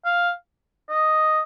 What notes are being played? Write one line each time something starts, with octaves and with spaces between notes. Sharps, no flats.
F5
D#5